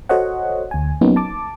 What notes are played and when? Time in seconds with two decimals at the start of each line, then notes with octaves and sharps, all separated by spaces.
0.09 F#4 A4 C5 C#5 D#5 F#5
0.71 D2 G#5
1.01 F#3 A#3 B3 C#4 D#4
1.16 A5 D6